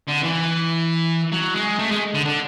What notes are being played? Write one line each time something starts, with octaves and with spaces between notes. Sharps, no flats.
D3
E3
F#3
G#3
A3
G#3
D3
D3